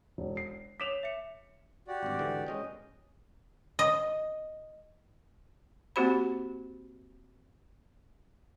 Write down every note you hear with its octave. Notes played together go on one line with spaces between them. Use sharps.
E1
C7
C#5 D6 B6 E7 F7
E5 C#7
F#4 G4 D5
G#1 G2
G#2 D3 E3
G#3 C#4 D#5 G5
D#5
A#3 C4 F#4 G4 C5 B5